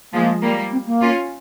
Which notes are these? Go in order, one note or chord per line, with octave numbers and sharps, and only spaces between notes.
F3 G#3 A#3
G3 A#3
C4
A#3
C#4 F4